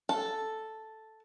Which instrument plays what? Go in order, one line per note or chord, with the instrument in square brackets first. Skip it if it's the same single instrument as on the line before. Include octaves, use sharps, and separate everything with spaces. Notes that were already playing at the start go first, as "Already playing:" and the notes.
[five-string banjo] A4